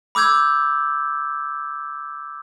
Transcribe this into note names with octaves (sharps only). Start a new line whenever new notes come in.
B5 D6 E6 G6 G#6